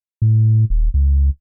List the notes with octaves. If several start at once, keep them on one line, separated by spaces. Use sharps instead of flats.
A2
D#1
C#2